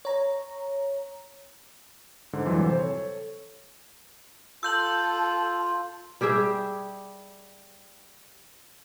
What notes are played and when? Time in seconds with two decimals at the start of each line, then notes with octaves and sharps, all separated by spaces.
0.05 C#5 A#5
2.33 G#2 D3
2.46 F2 E3 F#3 G3
2.63 C3 C5
2.78 A4 C#5
4.63 F4 A4 E6 G6 F#7
6.21 G3 G4 G#4 E5